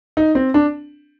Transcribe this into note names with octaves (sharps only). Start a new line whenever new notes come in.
D#4
C4
D4